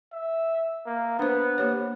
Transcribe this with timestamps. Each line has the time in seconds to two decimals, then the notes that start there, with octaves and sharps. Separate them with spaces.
0.13 E5
0.86 A#3
1.19 B3 D4 C5
1.58 A#3 G4 C#5